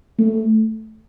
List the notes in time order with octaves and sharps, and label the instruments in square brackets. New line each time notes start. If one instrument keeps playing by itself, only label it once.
[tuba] A3